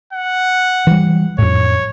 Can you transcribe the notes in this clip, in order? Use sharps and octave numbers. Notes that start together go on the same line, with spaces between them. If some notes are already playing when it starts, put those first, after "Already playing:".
F#5
E3 G3
F2 A2 C#5